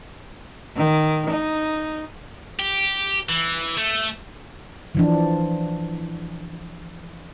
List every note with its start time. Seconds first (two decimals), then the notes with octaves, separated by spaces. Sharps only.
0.76 D#3
1.30 D#4
2.59 G4
3.29 E3
3.77 A3
4.95 E3 F3 D4